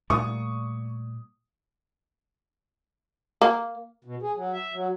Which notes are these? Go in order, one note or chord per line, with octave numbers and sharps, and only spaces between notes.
A#2 G3 A3 C#6 D#6
A#3
B2
G#4
F#3
E5
F#3